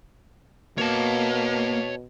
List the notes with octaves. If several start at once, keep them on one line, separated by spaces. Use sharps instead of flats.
B2 A#3 C#5 A5